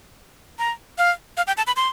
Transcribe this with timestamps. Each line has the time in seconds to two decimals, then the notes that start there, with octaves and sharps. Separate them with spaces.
0.59 A#5
0.98 F5
1.37 F5
1.47 G5
1.57 A5
1.67 B5
1.76 C6